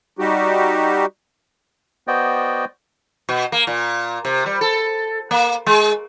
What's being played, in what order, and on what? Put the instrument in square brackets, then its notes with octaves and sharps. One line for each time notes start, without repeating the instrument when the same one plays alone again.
[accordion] G3 D#4 F#4 G4
[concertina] B3 F#4 C5 D5 D#5 G5
[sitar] B2
A#3
A#2
C3
G3
A4
A#3
G#3